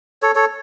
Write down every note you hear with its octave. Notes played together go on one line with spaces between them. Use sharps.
A4 C#5
A4 C#5